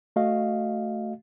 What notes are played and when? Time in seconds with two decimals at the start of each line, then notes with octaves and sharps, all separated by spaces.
0.16 A3 F#4 D#5 F5